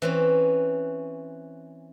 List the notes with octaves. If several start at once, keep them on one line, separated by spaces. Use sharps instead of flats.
E3 C4 C#4